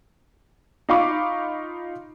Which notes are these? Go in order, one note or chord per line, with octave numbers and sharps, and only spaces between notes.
D#4 F4 F5 B5 C#6 D6